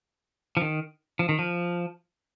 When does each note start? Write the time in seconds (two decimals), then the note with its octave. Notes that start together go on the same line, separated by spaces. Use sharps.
0.57 F3
0.62 D#3
1.19 F3
1.29 D#3
1.39 F3